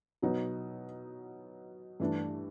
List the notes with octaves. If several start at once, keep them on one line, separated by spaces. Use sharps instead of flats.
B2 F#3 B3 D#4
G2 E3 A3 D4